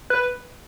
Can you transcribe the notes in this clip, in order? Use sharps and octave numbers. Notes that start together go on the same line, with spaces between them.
B4